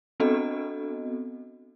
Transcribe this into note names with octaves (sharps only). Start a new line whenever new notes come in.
B3 C4 D4 F#4 A4 D#5